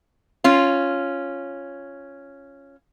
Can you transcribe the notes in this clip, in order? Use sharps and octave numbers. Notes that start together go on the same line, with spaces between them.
C#4 F4